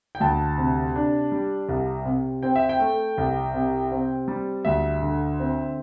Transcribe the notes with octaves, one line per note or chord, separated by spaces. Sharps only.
G5
D2 A5
C3
D4
G3
C2
C3
C4 G5
E5
G5
A3
C2
C3
C4
G3
D2 E5
D3
C4